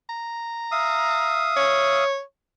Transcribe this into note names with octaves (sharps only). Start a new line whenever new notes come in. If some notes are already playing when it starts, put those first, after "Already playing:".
A#5
E5 F5 D#6
C#5